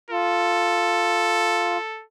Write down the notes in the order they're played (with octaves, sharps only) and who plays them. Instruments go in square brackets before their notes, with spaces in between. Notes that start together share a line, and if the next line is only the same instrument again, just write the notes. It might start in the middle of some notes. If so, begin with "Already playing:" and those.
[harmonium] F4 [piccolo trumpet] A4